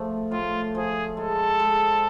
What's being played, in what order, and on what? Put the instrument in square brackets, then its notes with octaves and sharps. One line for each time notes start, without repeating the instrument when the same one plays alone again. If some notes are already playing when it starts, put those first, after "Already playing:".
Already playing: [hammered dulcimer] F3 A3
[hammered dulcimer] A2 [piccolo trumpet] F4
[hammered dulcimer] F3 [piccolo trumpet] G#4
[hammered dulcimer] G#3 [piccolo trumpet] A4
[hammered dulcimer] G#3